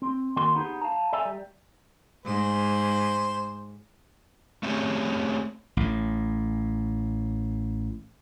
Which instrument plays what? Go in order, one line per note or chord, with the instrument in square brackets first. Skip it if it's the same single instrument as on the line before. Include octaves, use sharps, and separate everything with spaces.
[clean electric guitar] C4
D#2 A#3 F#4 A#4 C6
B3 D#4 G4 G#4
F5 A5 A#5
A4 D5 E5 G#5 A#5
G3
[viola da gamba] G#2 [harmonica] C5
[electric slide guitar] A3 C4 C#4 F4 G4 G#4
[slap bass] A1 A2